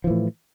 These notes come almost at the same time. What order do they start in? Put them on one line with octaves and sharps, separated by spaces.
F3 E3 A2